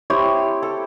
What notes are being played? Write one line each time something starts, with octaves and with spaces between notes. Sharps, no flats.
C4 E4 G4 C#5
A4